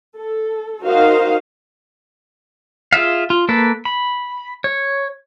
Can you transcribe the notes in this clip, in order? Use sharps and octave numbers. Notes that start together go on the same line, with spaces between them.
A4
D#4 F#4 A#4 C5 D#5 F5
F4 G#4 E5 F5
F4
A#3 A4 B4
B5
C#5